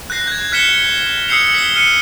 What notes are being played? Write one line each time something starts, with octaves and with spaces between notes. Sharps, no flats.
F#6 G6 A#6 C7
G6 G#6
F6 F#6 B6 C#7 E7 G7
D#6 E6 G6 C7 C#7 F7
B6 G7
F6 C#7 D#7